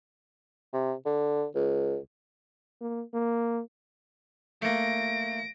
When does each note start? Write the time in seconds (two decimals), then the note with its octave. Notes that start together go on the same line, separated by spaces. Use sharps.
0.73 C3
1.06 D3
1.55 C#2
2.81 A#3
3.14 A#3
4.62 A3 A#3 A#6 D7